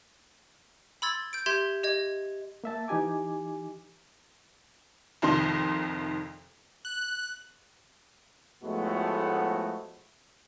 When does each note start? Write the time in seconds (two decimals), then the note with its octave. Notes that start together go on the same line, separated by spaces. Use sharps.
1.02 B5 C6 E6 G#6 A6
1.33 G6 D7
1.46 G4 E5 C6 G6 G#6 E7
1.83 G4 D#5 G#6
2.64 A#3 E5 A5
2.88 E3 D#4 G4 G#5 D6
5.22 C2 F2 D#3 D#4 C6
6.85 F#6
8.64 A2 F3 G#3 A3 B3 F#4